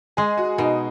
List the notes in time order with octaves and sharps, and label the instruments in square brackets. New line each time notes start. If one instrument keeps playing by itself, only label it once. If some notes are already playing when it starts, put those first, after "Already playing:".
[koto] G#3 [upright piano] G#4
[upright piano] F#4
[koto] B2 [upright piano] D#4